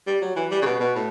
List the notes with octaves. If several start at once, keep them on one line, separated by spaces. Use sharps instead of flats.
G3
F#3
E3
G3
C#3
B2
B2
A2